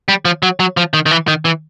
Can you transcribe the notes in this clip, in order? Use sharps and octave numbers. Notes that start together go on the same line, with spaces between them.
G3
F3
F#3
F#3
F3
D#3
D#3
E3
D#3
E3